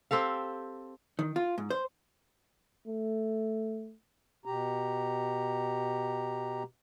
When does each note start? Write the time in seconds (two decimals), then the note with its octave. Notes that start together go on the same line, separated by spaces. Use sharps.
0.11 C4 G4 A4 F5
1.19 D#3
1.36 F4
1.58 G#2
1.70 C5
2.87 A3
4.45 B2 G4 A#5